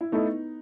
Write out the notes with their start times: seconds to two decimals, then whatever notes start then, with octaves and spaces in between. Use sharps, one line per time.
0.01 E4
0.12 A3 B3 D#4 E4 A4 D#5